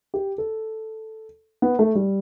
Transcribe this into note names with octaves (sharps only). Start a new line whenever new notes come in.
G4
A4
B3
A3
G3